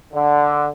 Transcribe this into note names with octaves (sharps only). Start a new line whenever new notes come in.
D3